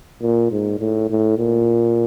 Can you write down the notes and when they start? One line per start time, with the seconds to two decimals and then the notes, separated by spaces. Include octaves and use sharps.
0.22 A#2
0.52 G#2
0.80 A2
1.10 A2
1.38 A#2